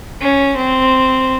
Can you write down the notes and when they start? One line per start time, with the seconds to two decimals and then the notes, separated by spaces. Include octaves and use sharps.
0.21 C#4
0.57 C4